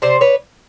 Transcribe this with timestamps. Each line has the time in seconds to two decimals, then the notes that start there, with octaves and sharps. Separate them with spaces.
0.02 C3 C5 D5
0.21 B4 C#5